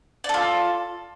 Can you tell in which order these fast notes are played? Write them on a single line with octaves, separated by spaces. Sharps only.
D5 A4 F4